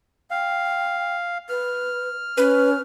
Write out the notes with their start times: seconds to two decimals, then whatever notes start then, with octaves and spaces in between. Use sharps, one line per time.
0.31 F5 G5
1.49 B4 F6
2.37 C#4 B4